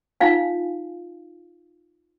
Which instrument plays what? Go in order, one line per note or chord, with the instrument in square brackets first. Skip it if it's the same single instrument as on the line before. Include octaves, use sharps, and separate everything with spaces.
[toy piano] D#4 F4 F5 G#5